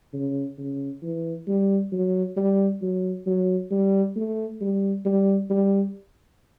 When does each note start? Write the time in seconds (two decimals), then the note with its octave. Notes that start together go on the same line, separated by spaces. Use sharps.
0.13 C#3
0.58 C#3
1.03 E3
1.48 G3
1.92 F#3
2.37 G3
2.82 F#3
3.26 F#3
3.71 G3
4.16 A3
4.61 G3
5.05 G3
5.50 G3